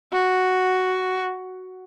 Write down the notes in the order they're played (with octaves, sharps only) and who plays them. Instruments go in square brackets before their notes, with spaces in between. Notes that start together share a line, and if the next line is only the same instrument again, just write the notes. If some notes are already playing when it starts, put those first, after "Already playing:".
[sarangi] F#4